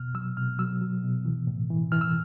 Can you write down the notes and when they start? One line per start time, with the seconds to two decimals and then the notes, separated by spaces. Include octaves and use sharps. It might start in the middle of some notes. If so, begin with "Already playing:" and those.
Already playing: B2 F6
0.14 F#3 E6
0.37 B2 F6
0.59 F#3 E6
0.81 F#3
1.03 B2
1.25 E3
1.47 A2
1.70 E3
1.92 E3 F6
2.01 E6